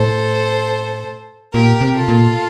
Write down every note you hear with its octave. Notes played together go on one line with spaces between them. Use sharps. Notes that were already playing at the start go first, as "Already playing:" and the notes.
Already playing: A2 A4 C5
A#2 G4 A#4
C3
F4 A4
A#2